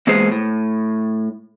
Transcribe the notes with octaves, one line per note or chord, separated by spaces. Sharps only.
E3 G#3 A#3 B3 G#4 C5
A2